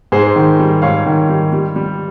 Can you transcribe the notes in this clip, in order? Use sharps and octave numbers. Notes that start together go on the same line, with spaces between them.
G#2 G#4 C5
D#3
G3
G#2 C#5 F5
D#3
G3
G3
G3